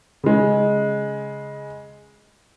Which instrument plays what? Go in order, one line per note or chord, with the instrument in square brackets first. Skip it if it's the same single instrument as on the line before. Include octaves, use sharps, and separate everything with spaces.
[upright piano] C#3 G#3